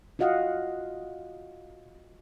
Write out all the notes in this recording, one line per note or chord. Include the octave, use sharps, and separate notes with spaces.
F4 F#4 D#5 F5 F#5